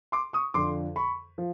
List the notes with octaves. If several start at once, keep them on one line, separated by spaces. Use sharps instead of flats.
C6 D6
C#6 D#6
F2 D3 F3 C6 D6
B5 C#6
F3